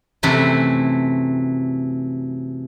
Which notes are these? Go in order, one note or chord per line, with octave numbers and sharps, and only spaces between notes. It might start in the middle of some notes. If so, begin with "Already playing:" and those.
F#2 C3 E3 A3 E4